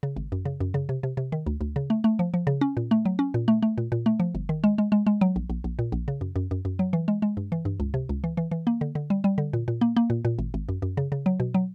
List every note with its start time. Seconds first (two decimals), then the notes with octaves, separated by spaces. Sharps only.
0.03 C#3
0.16 G#1
0.32 F#2
0.45 C#3
0.60 F#2
0.74 C#3
0.89 C3
1.03 C3
1.17 C3
1.32 D#3
1.46 D2
1.61 D2
1.76 C#3
1.90 A3
2.04 A3
2.19 F3
2.34 F3
2.47 C#3
2.61 C#4
2.77 A#2
2.91 A3
3.05 F#3
3.19 C#4
3.34 A#2
3.48 A3
3.63 A3
3.78 A#2
3.92 A#2
4.06 A3
4.20 F3
4.35 G1
4.49 D#3
4.64 G#3
4.78 G#3
4.92 G#3
5.07 G#3
5.21 F#3
5.36 A#1
5.50 A#1
5.64 A#1
5.79 A#2
5.92 A#1
6.08 C#3
6.21 F#2
6.36 F#2
6.51 F#2
6.65 F#2
6.79 F#3
6.93 E3
7.08 G#3
7.22 G#3
7.37 G2
7.52 E3
7.65 G2
7.80 C#2
7.94 C3
8.09 C#2
8.24 E3
8.37 E3
8.51 E3
8.67 A#3
8.81 D3
8.95 D3
9.10 G3
9.24 G3
9.38 D3
9.53 A#2
9.68 A#2
9.81 A#3
9.97 A#3
10.10 A#2
10.25 A#2
10.39 G#1
10.54 G#1
10.69 F#2
10.82 F#2
10.97 C#3
11.12 C#3
11.26 F#3
11.40 B2
11.54 F#3